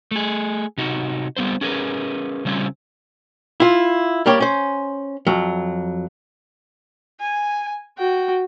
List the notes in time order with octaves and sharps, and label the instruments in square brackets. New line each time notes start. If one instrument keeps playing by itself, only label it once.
[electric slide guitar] A3 G#4
C3 D#4 F#4
G3 B3 C4 C5
C#4 G#4 A#4 B4
C#3 G3 C4 C#4 F4
[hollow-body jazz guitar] E4 F4
G3 A#3 G4 C#5
C#4 C5
F2 F#3
[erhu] G#5
[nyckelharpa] F#4 [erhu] G5